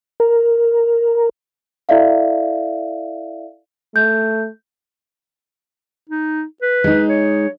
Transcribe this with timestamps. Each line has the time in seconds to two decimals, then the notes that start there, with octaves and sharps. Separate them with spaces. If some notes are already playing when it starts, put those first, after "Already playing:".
0.20 A#4
1.89 E4 A4 D5 E5 F5
3.96 A3 G6
6.10 D#4
6.62 B4
6.84 G#3 D#4
7.09 C#5